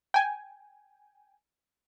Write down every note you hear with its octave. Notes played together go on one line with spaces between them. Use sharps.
G5 G#5